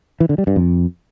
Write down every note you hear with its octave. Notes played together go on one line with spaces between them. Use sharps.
E3
D3
G3
G2
F2